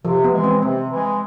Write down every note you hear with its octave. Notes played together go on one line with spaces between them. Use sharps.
C3 F3
B3
E3 G#3
C4
C3 C4
E3 G#3